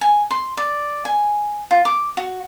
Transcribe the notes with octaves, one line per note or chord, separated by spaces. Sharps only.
G#5
C6
D5
G#5
F4
D6
F#4